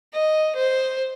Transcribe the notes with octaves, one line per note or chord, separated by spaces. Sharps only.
D#5
C5